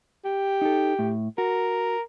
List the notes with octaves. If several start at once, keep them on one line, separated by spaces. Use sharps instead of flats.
G4
D#4 A4
A2
F#4 A#4